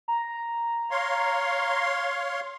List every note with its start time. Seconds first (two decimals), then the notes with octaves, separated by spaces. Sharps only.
0.08 A#5
0.91 C#5 F5 C6